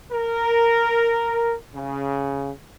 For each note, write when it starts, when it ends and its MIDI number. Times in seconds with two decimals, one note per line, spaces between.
0.11 1.54 70
1.75 2.50 49